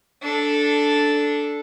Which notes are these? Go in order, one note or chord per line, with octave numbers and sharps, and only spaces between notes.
D4 A4